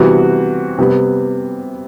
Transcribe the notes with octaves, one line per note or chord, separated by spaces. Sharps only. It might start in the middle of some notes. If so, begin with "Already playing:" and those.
Already playing: C3 E3 G3 B3 F#4
C3 G3 B3